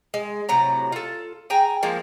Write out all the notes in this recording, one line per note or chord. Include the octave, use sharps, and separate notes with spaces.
G#3
A2 C3 F#3 A#5
F4 A4
G#4 G5 G#5 A#5
F3 G#3 A#3